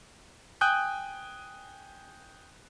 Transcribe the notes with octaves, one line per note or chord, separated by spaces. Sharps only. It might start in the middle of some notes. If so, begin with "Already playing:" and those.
G5 G#5 D#6 F#6 G6